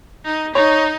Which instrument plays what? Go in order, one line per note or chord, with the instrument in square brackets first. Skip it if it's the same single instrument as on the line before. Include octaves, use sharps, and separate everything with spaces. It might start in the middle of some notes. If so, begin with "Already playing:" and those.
[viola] D#4
[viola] D#4 [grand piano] C#5